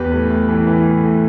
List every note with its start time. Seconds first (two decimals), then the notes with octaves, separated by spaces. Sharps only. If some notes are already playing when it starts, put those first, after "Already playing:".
Already playing: E2 G4 B4
0.12 A2
0.30 A2
0.49 E3
0.67 E3
0.86 A2
1.03 A2